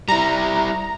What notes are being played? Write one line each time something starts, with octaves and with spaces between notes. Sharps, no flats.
G3 E4 A#5